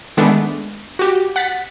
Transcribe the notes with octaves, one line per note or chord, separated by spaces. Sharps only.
D#3 G#3 A3 B3 D4
F#4 G4
F#5 F#6 A6 B6